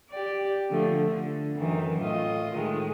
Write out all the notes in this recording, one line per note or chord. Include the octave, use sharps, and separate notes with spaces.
G4 D5
D3 F3 A3
D3
F#2 D#3 E3
A2 F4 D#5
A2 D#3 G#3